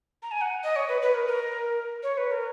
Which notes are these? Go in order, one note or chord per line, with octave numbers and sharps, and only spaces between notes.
A#5
G#5
F#5
D#5
C#5
B4
B4
A#4
A#4
C#5
B4
A#4